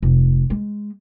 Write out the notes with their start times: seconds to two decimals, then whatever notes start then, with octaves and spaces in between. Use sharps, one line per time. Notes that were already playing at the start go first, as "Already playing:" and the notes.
0.02 F1
0.50 G#3